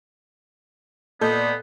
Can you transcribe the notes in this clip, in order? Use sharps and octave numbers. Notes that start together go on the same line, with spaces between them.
A#2 B3 A4 D5 D#5 G6